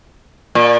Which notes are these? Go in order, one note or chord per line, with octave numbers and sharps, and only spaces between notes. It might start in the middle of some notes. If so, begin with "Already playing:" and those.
A#2